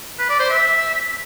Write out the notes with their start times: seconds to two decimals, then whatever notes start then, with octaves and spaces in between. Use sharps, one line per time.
0.19 B4
0.29 D5
0.39 C5
0.50 E5